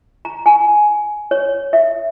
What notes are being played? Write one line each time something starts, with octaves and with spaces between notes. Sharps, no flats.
A#5
G#5
C#5
E5